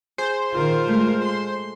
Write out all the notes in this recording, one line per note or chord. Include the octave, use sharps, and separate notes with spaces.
G#4 C5
A#1 D#3 F4 A#4
G#3 A3
C6